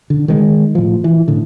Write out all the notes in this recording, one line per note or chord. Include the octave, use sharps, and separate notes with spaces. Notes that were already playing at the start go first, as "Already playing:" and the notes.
D3
D#3 G3 G#3
A2 F3
E3
A2 D3